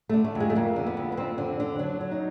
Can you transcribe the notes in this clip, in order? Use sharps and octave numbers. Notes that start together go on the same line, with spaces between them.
D3 A3
A3
F2
G#3
A3
F2 A#3
D3
B3
F2
B3
F2 C4
D3
D3
F#3 D4
F#3
D#4